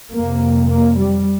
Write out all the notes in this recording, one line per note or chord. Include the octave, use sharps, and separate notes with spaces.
F2 C3 A#3
A#3
G3